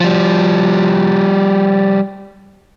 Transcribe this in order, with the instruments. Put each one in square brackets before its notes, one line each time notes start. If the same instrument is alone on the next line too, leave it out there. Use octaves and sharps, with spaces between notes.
[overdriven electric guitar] F3 G3